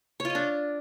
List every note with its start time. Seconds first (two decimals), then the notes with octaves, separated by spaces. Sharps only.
0.20 C#5
0.25 F4
0.30 D#5
0.35 D4